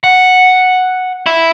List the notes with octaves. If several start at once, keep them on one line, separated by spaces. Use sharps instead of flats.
F#5
E4